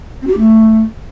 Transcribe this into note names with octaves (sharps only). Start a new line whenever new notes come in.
C4
F#4
G4
A3